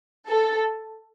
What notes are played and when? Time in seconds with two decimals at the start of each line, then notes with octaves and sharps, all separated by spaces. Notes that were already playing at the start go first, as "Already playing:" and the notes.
0.27 A4